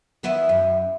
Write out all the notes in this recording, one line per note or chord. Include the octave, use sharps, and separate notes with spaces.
D#3 B3 E4
F#2